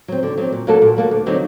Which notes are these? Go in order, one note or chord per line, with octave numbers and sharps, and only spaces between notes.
F#3 C4
D3
F#3 C4
A#2
F#3 A#3 F#4 A4
A#2
F#3 A#3 F#4 A4
D2
D3 F#3 C4 D#4